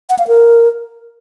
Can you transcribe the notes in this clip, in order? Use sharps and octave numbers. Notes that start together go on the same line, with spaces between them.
F#5
F5
A#4